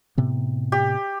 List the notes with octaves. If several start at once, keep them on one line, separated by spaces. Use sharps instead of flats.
A2 C3 B3
G4